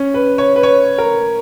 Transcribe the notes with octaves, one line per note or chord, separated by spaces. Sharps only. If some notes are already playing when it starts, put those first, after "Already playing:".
Already playing: C#4
B4
C#5
B4
C#5
A#4